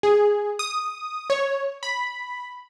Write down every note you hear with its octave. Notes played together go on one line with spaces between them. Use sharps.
G#4
D#6
C#5
B5